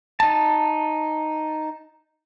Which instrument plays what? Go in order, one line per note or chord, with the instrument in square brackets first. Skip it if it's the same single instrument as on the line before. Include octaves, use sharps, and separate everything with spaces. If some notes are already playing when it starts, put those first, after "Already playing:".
[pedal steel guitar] D#4 A5